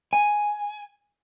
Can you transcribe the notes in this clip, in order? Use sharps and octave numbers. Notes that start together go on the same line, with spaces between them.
G#5